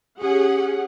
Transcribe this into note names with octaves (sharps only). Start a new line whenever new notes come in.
C#4 G4 G#4 F#5